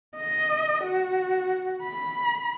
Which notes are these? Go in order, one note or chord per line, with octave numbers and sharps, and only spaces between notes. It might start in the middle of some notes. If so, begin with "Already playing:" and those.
D#5
F#4
B5